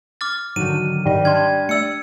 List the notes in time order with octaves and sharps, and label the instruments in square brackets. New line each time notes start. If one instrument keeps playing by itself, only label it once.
[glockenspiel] D6 F6 A6
[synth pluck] G#2 [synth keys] D3 D#3 F#3 [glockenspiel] D#7
[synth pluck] G#2 D#3 D#5 [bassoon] G3
[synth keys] D4 [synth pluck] A5 C6 F6 [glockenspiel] G#6
[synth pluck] A3 D5 [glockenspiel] E6 C#7